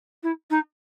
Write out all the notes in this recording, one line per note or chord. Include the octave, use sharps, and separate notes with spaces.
E4
D#4